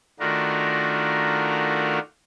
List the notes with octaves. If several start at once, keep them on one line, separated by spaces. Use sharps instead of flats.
D#3 A3 D4 F4 F#4 A#4